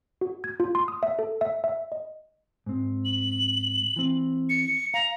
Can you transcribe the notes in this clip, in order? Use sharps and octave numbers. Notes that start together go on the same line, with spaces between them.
F#4
G#6
F4
C6
D#6
E5
A4
E5
E5
D#5
G#2 C4
F#7
E3 C4
C#7
F5 A#5